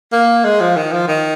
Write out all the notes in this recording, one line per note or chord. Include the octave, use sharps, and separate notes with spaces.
A#3
G#3
F3
D#3
F3
D#3